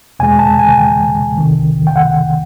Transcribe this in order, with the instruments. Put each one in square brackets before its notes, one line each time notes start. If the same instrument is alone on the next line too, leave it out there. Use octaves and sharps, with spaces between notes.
[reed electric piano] E2 B2 G#3 G#5
A5
G#5
G5
C2 C3 D#3
G5
F#5